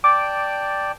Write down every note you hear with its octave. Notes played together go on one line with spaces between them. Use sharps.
D5 G5 A5 D6